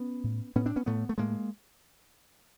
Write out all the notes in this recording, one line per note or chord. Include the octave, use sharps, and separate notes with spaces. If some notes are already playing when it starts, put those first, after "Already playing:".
Already playing: B3 C#4
A2
A2 B3 C#4
C4 D4
B3 C#4
A2 A3 B3
A3
A2 G#3 A#3